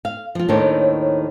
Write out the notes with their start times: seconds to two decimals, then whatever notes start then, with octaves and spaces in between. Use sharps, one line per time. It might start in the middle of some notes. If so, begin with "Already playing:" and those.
0.05 F5
0.35 F3 F4
0.48 D#2 A2 D#3 D4 C5 C#5